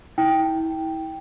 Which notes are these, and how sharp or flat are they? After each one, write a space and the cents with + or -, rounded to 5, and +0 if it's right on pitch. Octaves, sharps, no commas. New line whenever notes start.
E4 -35 G5 +0